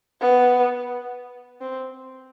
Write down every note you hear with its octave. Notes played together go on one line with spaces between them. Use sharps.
B3
C4